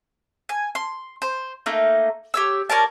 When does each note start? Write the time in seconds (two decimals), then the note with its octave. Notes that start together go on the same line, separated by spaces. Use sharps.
0.49 G#5
0.75 C6
1.22 C5
1.66 A3 A#3 D#4
2.34 G4 C#5 E6
2.70 C#4 A#4 D5 A5